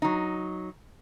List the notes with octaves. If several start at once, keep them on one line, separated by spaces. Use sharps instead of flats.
F#3 D#4